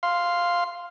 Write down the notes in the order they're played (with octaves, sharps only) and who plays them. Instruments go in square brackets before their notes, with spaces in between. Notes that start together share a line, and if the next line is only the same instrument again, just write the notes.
[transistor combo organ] F5 C6